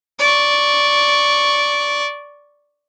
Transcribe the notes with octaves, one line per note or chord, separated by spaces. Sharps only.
D5 C#6